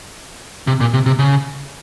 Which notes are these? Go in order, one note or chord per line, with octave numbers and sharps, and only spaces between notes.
C3
A#2
C3
C3
C#3